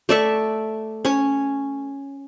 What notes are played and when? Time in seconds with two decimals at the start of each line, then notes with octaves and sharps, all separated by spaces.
0.09 A3 D5 E5 C#6
1.05 C#4 C#5